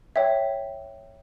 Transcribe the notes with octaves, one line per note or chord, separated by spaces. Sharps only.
C#5 E5 G5